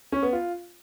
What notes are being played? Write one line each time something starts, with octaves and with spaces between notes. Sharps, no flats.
C#4
B3
F4